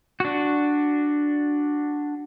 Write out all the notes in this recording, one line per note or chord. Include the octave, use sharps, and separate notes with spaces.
D4 F#4